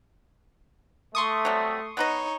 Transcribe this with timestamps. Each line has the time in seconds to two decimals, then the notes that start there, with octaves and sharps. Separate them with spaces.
1.15 A3 C6 C#6 D#6
1.45 F#3 G3 C4
1.97 B3 D#4 B4 C#5 D#5